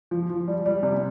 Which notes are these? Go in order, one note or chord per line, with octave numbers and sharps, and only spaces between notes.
F3
F3
G3
G3
C3